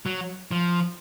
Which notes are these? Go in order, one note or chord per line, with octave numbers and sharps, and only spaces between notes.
F#3
F3